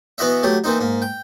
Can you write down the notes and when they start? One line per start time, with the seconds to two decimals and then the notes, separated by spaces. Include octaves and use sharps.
0.18 E3 B3 E4 F#4 D#5 E5
0.43 F#3 A3 G4
0.64 E3 A#3 C4 D#4
0.80 G#2 A#3
1.02 G5